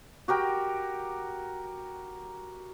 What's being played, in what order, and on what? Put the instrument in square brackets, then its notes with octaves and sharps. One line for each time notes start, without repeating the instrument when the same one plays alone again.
[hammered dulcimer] F#4 G4 A#4 G5